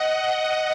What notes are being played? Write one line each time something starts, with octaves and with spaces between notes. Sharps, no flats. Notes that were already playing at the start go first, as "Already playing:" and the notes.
Already playing: D#5 F#5